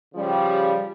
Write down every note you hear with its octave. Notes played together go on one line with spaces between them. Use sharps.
C#3 F3 G3